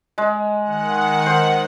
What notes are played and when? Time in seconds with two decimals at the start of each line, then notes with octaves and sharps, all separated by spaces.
0.18 G#3
0.64 D#3 F#5
1.26 C5